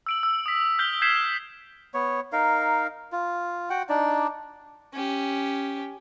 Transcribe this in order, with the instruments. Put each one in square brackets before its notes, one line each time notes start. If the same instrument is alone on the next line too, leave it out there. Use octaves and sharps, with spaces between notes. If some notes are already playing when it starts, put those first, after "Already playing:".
[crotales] E6 D7 F#7
E6
D#6 B6
F6 G6 B6 G7
G6 G#6 B6 C7 E7 G7
[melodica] B3 C#5
D#4 A#4 F5
F4
F#4 F#5 G5
D4 D#4 D5
[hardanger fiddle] C#4 G4